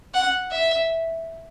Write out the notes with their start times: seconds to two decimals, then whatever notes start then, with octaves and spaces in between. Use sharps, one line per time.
0.14 F#5
0.51 E5